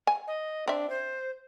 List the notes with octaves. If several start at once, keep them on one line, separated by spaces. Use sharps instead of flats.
G#5
D#5
C4 D4 E5
C5